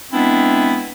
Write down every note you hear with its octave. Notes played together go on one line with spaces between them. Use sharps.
E3 G#3 B3 C4 D4 E4